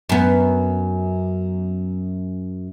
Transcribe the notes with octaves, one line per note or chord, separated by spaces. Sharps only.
F#2 B3